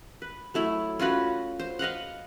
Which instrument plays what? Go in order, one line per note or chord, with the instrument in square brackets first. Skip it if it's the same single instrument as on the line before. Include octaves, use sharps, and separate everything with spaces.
[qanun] B4
F#3 A3 E4
C#4 F4 F#4 B4
C5
B4 D#5 F5 F#5